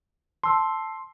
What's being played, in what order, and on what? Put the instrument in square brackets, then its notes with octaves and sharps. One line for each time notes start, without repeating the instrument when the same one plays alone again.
[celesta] A5 E6 [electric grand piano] C6